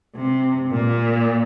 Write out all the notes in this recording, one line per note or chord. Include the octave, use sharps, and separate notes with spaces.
C3
A#2